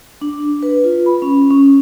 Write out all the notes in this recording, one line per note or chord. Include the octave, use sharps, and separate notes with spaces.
D4
B4
F4
B5
C#4
C#4